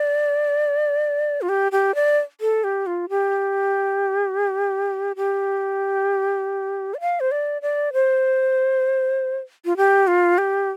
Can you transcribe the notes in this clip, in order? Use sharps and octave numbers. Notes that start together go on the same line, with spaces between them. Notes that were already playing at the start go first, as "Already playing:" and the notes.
Already playing: D5
F4
G4
G4
D5
A4
G4
F4
G4
G4
D5
F5
C5
D5
D5
C5
F4
G4
F4
G4